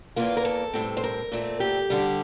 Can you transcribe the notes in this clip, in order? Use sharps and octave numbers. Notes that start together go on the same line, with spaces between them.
E2 E3 A#3 F4
A#4
A4
A2 G3 C4
C5
A#4
A#2 A3 C4
G4
D2 D3 G3